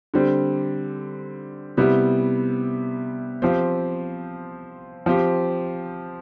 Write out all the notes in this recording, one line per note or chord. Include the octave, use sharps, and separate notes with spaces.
D3 G3 C4
C3 G3 B3 E4
F3 C4 G4
F3 C4 G4